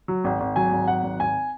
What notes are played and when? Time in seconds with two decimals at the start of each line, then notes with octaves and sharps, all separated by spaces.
0.08 F#3
0.24 G#1
0.40 G#1
0.56 F#3 G#5
0.72 G#1
0.88 F#3 F#5
1.03 G#1
1.20 G#1 G#5